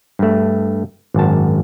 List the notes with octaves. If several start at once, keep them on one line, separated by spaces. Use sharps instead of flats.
G2 A3
G#1 F#2 A5